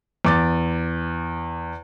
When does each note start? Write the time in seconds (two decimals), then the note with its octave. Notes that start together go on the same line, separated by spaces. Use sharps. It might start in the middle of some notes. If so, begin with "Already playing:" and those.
0.25 E2 D6 A6